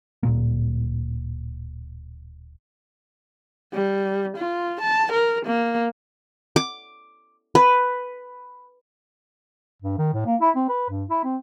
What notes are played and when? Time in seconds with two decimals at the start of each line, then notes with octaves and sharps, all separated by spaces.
0.23 D1 A#2 A#3
3.74 G3
4.37 F4
4.81 A5
5.12 A#4
5.46 A#3
6.56 D6
7.55 B4
9.82 G2
9.98 D#3
10.14 A2
10.26 A#3
10.41 E4
10.56 C4
10.69 B4
10.90 G2
11.10 E4
11.24 C4